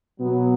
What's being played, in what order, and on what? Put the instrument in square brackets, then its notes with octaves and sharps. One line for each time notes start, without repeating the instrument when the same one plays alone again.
[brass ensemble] B2 F#3 B3